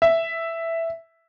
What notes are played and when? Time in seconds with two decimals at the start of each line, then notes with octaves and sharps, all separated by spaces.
0.02 E5